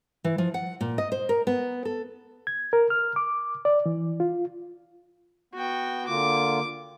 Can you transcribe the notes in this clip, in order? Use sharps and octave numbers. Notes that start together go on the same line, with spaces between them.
E3
F3
F#5
A#2
D#5
C5
A#4
B3
A4
G#6
A#4
F6
D6
D5
E3
F4
B3 F#4 G5
D3 A#3 F4 D6